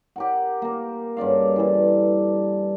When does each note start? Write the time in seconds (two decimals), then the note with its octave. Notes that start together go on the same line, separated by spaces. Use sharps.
0.16 G4 A#4 F#5
0.62 A#3 A#4
1.17 G2 C#3 D5 F5
1.56 E3 G3 A4